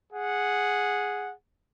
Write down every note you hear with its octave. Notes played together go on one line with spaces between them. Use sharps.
G#4 F#5